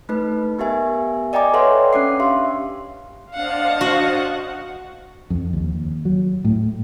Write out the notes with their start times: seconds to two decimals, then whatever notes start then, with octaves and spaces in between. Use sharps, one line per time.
0.09 A3 D#4 B4
0.59 B3 G4 A#4 E5 G#5
1.33 D5 D#5 G5 G#5 A#5 D6
1.54 A4 B4 C#5 E5 F#5 C6
1.93 C#4 D4 D6 C7
2.20 G4 E5 F5 C6
3.34 D4 C5 D#5 F5 F#5 A5
3.81 F#4
5.30 F2
5.53 D#2
6.05 F#3
6.44 A2